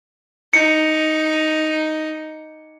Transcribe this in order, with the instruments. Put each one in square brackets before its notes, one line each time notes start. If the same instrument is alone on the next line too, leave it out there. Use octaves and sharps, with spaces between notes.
[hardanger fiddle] D#4 [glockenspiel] C#7